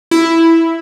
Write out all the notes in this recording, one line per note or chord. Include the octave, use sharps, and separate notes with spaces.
E4